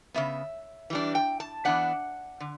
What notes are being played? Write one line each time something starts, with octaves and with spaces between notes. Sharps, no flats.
C#3 G3 B3 E5
E3 G3 D4
G5
A5
E3 B3 D4 F#5
D3